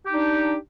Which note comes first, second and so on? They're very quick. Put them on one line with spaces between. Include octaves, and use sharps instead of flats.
G4 D#4 D4